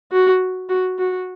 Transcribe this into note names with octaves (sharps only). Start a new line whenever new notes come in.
F#4
F#4
F#4